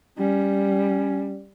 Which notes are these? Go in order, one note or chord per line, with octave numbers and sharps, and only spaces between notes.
G3 C#4